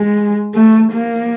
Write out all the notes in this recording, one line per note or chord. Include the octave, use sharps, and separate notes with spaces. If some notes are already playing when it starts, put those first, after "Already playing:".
Already playing: G#3
A3
A#3